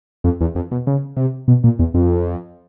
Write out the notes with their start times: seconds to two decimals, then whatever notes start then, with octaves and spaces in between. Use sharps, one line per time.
0.24 F2
0.41 E2
0.55 F2
0.72 B2
0.87 C#3
1.17 C3
1.48 B2
1.64 A#2
1.79 E2
1.94 F2